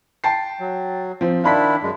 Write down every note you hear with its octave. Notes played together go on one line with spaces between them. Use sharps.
G5 A5 C7
F#3
F3 C4
D#3 D4 E4 F5 B5 B6
F#2 G#3